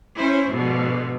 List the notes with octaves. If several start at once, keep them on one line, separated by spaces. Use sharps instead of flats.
C#4 E4 C5
G#2 B2 D3 F3